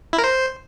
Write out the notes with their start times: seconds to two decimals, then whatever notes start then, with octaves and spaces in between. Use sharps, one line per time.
0.13 E4
0.18 A#4
0.24 C5